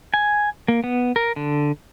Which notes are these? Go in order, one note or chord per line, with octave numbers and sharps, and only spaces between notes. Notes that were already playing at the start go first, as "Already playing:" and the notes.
G#5
A#3
B3
A#4
D3